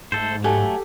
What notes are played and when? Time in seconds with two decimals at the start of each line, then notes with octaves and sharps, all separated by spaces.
0.12 G#2 A3 A4 C5
0.44 F#3 A3 G4 A4 F#5 G#5